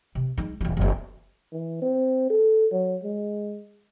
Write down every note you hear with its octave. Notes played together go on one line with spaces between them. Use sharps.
C3
G#3 D#4
D#1 E3
F#1 E2
E3
C4
A4
F#3
G#3